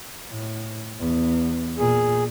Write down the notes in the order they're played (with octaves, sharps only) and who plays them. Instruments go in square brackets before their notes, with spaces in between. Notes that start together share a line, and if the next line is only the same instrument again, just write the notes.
[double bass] A2
E2
[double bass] A#2 [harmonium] G#4